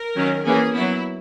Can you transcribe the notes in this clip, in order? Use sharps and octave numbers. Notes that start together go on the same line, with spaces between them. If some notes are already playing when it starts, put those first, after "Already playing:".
Already playing: A#4
D#3 F#3 C#4
E3 A#3 C#4 G#4
F#3 B3 E4